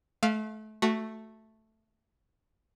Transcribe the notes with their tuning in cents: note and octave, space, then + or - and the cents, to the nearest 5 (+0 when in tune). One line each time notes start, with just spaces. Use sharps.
A3 -30 F5 +0
A3 +0 F#4 +5